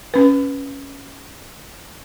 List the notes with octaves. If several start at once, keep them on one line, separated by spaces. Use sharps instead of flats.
C#4 B4